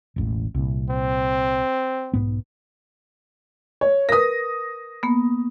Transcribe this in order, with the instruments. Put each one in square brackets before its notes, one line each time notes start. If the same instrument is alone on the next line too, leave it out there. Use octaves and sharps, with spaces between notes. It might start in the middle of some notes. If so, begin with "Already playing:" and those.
[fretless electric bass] E1 A1
C2 A#2
[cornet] C4
[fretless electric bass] B1 G#2 B3
[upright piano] C#5
[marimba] A#4 B4 [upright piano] D#6 A#6
[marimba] A#3 B3